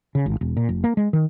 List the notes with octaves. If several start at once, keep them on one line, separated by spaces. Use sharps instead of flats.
C#3
G#1
E1
A#2
F1
A#3
G#3
D#3